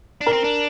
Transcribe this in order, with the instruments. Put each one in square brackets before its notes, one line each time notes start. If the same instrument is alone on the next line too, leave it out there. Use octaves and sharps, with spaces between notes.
[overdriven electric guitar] D4
[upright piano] A#4 A#5
[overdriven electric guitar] C4
D4